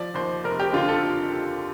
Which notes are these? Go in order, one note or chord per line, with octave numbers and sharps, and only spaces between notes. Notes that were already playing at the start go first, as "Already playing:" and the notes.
Already playing: F3 D5
D#2 C5
F1 A#4
G4
D3 F4
A4